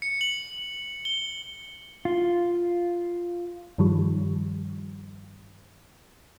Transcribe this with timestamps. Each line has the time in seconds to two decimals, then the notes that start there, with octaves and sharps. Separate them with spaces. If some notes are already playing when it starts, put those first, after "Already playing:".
0.02 C#7
0.21 F#7
1.05 G7
2.05 F4
3.78 G2 D#3 F3 G3